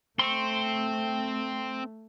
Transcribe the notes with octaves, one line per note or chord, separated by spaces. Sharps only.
A3 C4 C6 C#6